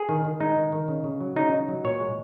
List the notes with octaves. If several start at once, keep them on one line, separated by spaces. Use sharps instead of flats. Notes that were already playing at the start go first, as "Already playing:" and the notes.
Already playing: G#4
D#3
D#3
G#3 D#4
D#3
D#3
C#3
C#3
F#3
C#3 D#4
D#4
F#3
A#2 C#5
G#3